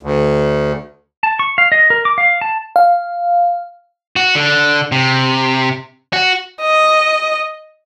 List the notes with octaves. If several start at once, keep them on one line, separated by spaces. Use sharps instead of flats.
D2
A5
C#6
F5
D#5
A#4
D6
F5
A5
F5
F#4
D3
C3
F#4
D#5